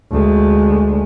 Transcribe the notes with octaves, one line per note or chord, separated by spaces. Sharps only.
D2 G#3